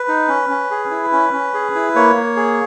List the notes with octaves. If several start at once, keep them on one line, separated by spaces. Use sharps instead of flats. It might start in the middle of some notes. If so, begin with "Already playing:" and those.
Already playing: B4
D#4
C#4
C#4
G#4
E4
C#4
C#4
G#4
E4
A#3 C#5
A#3
G#4